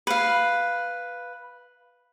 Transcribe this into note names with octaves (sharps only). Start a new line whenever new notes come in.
B4 F5